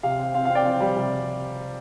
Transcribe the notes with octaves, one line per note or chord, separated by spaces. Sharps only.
C3 F5
C4
C4 F5
F5
C4
D5 G5
C4
G3
C3